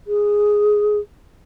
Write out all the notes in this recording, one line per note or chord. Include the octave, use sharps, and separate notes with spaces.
G#4